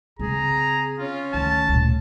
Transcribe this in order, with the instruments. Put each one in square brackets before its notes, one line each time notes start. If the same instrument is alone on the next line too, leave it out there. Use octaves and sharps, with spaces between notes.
[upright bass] C#3 C4 [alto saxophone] G#4 [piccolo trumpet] A#5
[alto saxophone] C#4 [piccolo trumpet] F4
[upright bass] D2 D#3 [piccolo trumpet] A5
[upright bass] D2 A#2